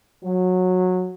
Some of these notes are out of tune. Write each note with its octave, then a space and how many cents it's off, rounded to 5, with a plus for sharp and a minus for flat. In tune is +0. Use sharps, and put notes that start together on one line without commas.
F#3 -15